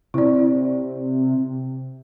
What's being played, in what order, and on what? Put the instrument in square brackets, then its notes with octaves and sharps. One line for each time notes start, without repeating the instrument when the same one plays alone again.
[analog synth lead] C3 [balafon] E4 D5